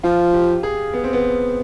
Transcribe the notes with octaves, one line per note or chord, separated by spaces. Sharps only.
F3 F4
G4
G#4
B3
C4
B3